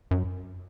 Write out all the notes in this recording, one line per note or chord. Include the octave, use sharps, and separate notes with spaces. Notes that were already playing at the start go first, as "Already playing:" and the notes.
F#2